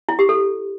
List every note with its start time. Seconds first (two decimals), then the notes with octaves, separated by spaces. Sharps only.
0.09 E4
0.19 G4
0.29 A4